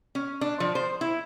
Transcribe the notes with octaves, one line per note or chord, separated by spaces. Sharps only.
C#4
D4
F3
C5
E4